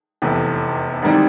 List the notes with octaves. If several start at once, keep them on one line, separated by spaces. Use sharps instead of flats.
F1 E2 C3 E3 A3
A1 G#2 D#3 G3 C4